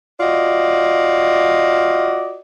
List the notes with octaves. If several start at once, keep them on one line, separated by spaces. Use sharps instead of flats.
F4 F#4 D5 D#5